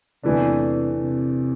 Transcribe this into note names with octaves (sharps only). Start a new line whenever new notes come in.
E2 C3 E3 A3 D4
C3